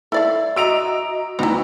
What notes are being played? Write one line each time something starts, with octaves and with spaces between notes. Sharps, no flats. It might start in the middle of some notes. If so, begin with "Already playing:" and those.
E4 A4 D5 F5
F#4 D#5 A#5 E6 D7 F7
D2 B3 D#4 E4 A#5